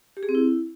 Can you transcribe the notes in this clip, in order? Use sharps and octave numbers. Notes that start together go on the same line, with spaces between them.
G4
G#4
C4
E4